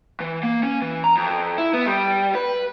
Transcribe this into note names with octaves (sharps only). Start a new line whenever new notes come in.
E3
A#3
C#4
E3
A#5
F2
E4
B3
G3
B4